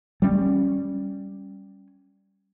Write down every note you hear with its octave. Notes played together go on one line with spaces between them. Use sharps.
G3 C#4